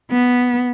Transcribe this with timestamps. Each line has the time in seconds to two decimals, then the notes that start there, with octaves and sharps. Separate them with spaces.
0.11 B3